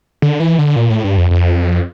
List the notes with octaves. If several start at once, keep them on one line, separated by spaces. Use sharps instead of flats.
D3
E3
D3
A#2
A2
G2
F2
F2